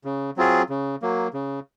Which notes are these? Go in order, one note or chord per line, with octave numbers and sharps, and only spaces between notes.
C#3
F#3 C4 F4 G#4
C#3
F#3 A#3
C#3